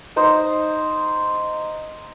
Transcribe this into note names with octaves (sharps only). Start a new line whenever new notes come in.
D#4 C5